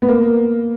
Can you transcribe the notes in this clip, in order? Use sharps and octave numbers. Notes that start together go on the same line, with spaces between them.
B3
A#3